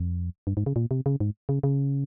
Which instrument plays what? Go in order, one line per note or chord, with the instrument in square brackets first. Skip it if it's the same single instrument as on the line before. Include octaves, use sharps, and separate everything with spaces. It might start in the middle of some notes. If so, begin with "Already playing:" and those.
Already playing: [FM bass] F2
G2
G#2
C#3
A#2
C3
C#3
G#2
C#3
C#3